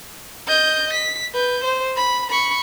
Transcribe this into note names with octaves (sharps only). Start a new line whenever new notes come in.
D#5 G6
B6
B4 G6
C5
B5
B5 C#6